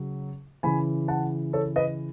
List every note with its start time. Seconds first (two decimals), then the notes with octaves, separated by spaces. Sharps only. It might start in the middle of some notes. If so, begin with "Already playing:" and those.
Already playing: C#3 F#3
0.63 C#3 E3 G#5 B5
1.08 F#5 A5
1.53 A4 C#5
1.76 B4 D#5